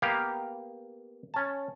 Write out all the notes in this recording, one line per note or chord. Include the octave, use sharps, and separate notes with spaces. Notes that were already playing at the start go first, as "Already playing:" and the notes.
A#3 B3 G4 F5
C#4 A5